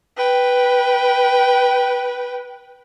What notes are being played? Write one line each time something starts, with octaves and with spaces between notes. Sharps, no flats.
B4 G5